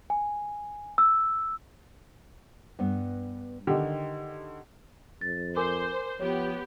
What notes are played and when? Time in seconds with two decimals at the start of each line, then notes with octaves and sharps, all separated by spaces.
0.10 G#5
0.98 E6
2.79 G2 B3
3.67 D3 D#3 G4
5.21 F2 A6
5.56 A#4 C5 G#5 D6
6.20 F3 B3 G4 C#5